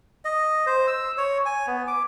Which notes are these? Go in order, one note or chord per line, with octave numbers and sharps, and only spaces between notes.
D#5
C5
E6
C#5
G#5
B3
D6